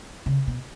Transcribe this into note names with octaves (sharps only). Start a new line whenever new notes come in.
C#3
B2